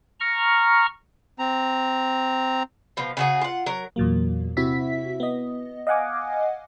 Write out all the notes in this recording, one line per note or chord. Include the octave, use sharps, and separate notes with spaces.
A#5 C#6 F6
C4 A#5
B2 F3
C#3 F#4 G#4
F4 F#5
F#3 A#4
E2 A#2 F#3 A#3
C3 C4 E4 F#4 E5 B6
B3 D#5
D#5 F5 F#5 G#5 D6